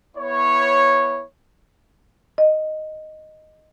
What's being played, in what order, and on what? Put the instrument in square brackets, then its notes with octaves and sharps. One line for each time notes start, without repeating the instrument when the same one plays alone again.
[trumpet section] B3 E4 C#5
[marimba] D#5